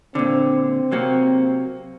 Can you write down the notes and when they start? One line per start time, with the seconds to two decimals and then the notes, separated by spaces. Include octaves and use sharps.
0.15 A#2 D3 C4
0.92 C3 F#3 A#3